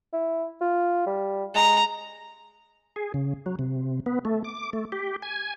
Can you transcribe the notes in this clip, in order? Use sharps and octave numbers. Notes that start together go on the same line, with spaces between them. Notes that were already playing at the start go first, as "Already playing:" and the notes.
E4
F4
G3
G#3 A#5
G#4
C#3
F#3
C3
B3
A3
D6
A3
G4
G#5